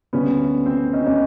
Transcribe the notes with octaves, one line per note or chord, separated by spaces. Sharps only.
D2 D3 G3 B3 C#4
C4
C#4 D#4
C#4 D#4